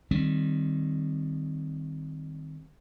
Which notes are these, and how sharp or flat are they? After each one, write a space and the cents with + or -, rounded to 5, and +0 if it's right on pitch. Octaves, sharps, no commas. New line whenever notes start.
D#3 -10 G3 +0 C4 +0